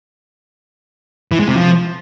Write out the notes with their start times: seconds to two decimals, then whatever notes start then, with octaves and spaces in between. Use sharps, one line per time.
1.32 E3
1.40 G#3
1.48 C3
1.56 F3